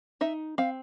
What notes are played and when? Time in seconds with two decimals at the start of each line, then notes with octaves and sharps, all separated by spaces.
0.21 D#4 E5
0.58 C4 F5